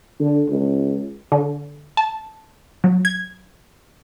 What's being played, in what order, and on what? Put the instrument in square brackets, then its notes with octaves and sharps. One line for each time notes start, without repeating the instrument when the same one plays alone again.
[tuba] D3
C#2
[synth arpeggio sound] D3
A5
F#3
G#6